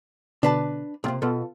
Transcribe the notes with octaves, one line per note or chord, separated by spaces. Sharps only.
B2 D3 D4 B4 A5
B1 C3 A#3 C4 F4
B2 B3 F4 A4